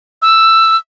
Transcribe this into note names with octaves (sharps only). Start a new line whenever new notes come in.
E6